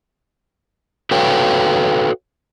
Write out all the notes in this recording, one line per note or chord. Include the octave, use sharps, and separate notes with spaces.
F#4 A4 B4 C#5 F5 G5